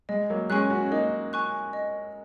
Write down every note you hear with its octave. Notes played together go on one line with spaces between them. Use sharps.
G#3 D#5
F#3 A#3
G#3 C#4 G#5 C#6 F#6
C#4 F#4
A#3 D#4 D#5
G#5 C#6 F#6
D#5